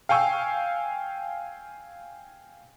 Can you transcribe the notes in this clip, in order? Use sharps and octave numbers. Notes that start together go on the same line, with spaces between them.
F5 G5 G#5 C#6 E6